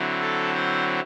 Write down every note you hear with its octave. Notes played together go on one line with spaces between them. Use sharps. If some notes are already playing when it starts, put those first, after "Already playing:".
Already playing: D3 F#3 C4 E4
A4
C5